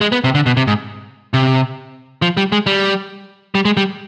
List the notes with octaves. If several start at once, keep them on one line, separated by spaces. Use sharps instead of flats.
G#3
B3
C3
D3
B2
C3
G#2
C3
F3
G3
G#3
G3
G3
G#3
G3